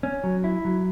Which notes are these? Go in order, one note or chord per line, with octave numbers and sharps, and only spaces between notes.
C#4
F#3
E4
F#3